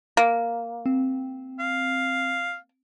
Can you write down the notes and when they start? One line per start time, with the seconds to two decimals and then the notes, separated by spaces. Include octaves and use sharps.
0.17 A#3
0.86 C4
1.59 F5